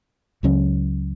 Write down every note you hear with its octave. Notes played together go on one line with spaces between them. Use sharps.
C#2 C#3 F#3 C#4